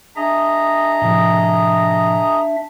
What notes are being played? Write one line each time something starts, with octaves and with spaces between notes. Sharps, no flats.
D4 G#4 D#5 E5 A#5
A2 C3 F3